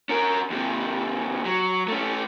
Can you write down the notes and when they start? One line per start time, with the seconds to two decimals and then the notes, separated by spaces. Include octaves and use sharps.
0.09 C#4 A#4
0.50 D#2 C3
1.45 F#3
1.88 A3 C#4